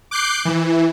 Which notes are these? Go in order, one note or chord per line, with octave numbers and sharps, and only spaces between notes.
D6 F#6 G6 C7
E3